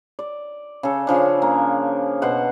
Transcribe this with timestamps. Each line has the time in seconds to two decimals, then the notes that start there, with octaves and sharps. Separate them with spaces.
0.19 D5
0.83 C#3 A4
1.07 C#3 F3 D4
1.42 A#3
2.22 B2 C5 F#5